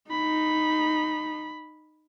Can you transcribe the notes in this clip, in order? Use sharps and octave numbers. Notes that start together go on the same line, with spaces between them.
D#4 B5